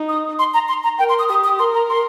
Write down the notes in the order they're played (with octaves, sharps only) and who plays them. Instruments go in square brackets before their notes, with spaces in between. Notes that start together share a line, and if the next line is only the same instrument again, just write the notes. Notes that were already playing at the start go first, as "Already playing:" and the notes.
Already playing: [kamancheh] D#4
[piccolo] D#6
C6
A#5
C6
A#5
[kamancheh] A#4 [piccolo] G5
[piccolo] C6
D#6
[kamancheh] G4 [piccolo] D#6
[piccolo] D#6
[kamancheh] A#4 [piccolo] C6
[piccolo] A#5
C6